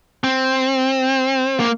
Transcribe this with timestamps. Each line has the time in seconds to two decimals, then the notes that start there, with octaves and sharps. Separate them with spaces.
0.24 C4
1.60 A#3